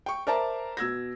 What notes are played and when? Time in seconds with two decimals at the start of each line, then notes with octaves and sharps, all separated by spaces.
0.06 G5 C#6
0.27 A#4 C5 D5 E5 A5 A#5
0.77 B2 E6 G#6 A#6